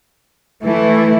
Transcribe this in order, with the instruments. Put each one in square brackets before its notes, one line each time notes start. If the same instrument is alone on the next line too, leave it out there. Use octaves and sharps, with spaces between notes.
[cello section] E3 A3 E4